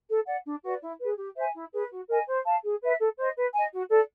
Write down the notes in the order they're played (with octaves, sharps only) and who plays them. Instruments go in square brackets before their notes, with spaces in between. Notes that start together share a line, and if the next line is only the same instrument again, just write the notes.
[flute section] A4
D5 F#5
D4
F#4 B4 D5
E4
G#4 B4
G4
C5 E5 G#5
E4
G#4 B4
F#4
A#4 D#5 G#5
C5
F5 A5
G#4
B4 E5
A4
C5 D#5
B4
D#5 G#5
F#4
A4 D5